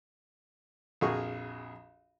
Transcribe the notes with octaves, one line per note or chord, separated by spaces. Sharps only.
A#1 F2 F#4 G#4 A#4 C#6